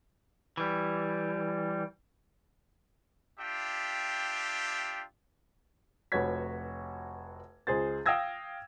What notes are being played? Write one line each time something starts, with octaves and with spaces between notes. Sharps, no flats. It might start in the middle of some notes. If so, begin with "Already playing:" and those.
E3 G3
D4 F4 G4 E5 G5
F1 F#4 B4 C#5 G#6 B6
C#2 G#4 C5 A6
F5 G5 D#6 E6 G#6 A#6